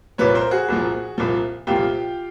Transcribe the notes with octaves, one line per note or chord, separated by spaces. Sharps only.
C2 A#2 F3 B4 C#5
A#4 C5
F#4 G#4
C2 A#2 F3
C2 A#2 F3
C2 A#2 F3 F4 G4